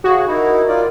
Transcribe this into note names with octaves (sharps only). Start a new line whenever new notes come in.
C#3 F#4 G#4
D#4 E4 A#4
F4 D5